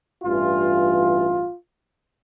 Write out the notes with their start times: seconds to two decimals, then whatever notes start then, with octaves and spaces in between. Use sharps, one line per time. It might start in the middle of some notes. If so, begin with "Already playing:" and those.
0.23 A1 G2 E3 F4